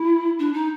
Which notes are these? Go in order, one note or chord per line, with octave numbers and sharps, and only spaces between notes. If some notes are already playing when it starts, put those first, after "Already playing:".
Already playing: E4
D4
D#4